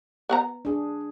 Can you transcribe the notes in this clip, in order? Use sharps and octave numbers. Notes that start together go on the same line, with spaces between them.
B3 F#5 A#5
D4 G#4